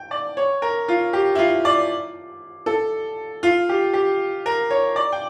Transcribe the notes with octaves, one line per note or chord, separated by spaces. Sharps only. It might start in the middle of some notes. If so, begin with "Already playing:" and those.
Already playing: G5
D5
C#5
A#4
F4
G4
E4
F4
D5
A4
F4
G4
G4
A#4
C#5
D5
G5